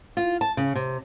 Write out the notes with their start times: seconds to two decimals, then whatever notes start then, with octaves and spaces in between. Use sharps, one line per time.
0.17 F4
0.41 A5
0.57 C#3
0.76 C3